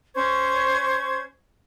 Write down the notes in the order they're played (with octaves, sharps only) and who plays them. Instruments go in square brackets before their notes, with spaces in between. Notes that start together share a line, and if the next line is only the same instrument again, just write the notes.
[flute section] C#4 C5 C#6 G#6